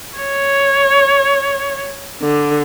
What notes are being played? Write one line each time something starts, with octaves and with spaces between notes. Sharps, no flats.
C#5
D3